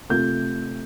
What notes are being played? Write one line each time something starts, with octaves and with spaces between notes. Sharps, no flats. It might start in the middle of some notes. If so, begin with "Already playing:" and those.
C3 A3 F4 G6